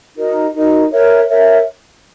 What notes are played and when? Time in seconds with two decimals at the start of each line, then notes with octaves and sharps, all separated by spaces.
0.16 D#4 F#4 A#4 D#5
0.53 D#4 F#4 A#4 D#5
0.91 A#4 C#5 E5
1.28 A#4 C#5 E5